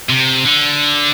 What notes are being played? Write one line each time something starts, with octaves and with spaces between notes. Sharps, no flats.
C3
D3